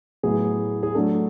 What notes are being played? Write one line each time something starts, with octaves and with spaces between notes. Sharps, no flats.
A2 F#3 B3 E4 G#4
G#4
F#3 A3 D4 A4